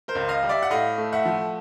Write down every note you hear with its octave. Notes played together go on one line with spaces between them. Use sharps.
A#4 C5
C#2
D#5 F5
G3
D5 E5
F#5
A2 D#5 F5
A3
E5 F#5
F3